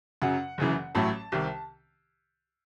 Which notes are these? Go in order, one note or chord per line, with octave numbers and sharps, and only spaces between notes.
F#2 C#3 F#3 F#5
F#1 F#2 C#3 E3
A1 A2 F#3 A3 A5
C2 C3 D#3